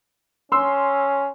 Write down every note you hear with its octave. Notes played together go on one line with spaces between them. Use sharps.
C#4 C6 E6